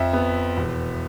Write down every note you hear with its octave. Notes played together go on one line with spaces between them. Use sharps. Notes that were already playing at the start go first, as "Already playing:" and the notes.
Already playing: F2 F3 E5
B3
E1